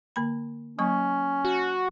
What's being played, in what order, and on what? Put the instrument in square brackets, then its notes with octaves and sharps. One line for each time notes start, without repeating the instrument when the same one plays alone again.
[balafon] D3 A#3 B5
[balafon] F#3 A#3 C#6 [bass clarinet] C#4
[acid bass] F#4